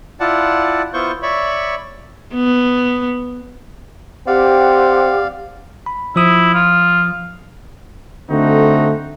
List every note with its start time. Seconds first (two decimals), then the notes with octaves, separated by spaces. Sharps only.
0.20 E4 F4 D5 F#5 A5
0.93 B3 E4 F4 C5 C#6 G6
1.23 C#5 D5 E5 B5 C#6
2.34 B3
4.27 C4 G4 D5 F5 F#5
5.86 B5
6.16 F3 E4 D#6
6.54 F4
8.31 D3 A3 C4 D#4 F#4